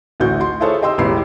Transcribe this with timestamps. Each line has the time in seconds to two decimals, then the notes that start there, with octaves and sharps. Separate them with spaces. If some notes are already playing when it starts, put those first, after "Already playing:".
0.20 A1 D2 F#4 G6
0.41 C6
0.60 E4 F4 G#4 A4 C5 C#5
0.82 G4 D#5 G5 C6 E6
0.98 E1 A1 E2 G4 B5 C7